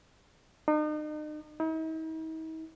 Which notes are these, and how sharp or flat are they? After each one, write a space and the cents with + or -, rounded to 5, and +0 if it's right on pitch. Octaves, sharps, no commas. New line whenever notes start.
D#4 -40
D#4 +45